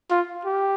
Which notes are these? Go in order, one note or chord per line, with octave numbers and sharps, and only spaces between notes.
F4
G4